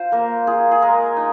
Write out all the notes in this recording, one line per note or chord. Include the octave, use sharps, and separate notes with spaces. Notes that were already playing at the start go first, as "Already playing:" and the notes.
Already playing: F4 C5
A#3 A#4
F4 G#4
G#4
G#3 A#4
D#4